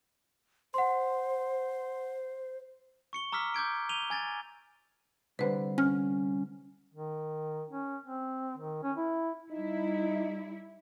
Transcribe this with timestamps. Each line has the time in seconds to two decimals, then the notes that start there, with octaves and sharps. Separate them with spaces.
0.74 C5 F#5 C6
3.13 C#6 C#7 G7
3.32 A#5 D6 E6 F6 B6
3.54 D6 G6 G#6 D7
3.89 D#7 F7 G7
4.10 G#5 G#6 A6
5.39 C2 D3 G3 B4 C5
5.78 C#4 F6
6.94 D#3
7.71 C#4
8.06 C4
8.57 D#3
8.83 C#4
8.97 E4
9.51 G3 D#4 E4